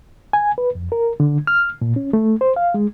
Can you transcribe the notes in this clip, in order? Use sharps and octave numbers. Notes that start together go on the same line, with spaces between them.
G#5
B4
F2
A#4
D3
F6
A#2
C#4
A3
C5
F5
G#3